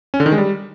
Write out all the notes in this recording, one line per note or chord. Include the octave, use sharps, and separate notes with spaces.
C#4
D3
D#3
G#3
G3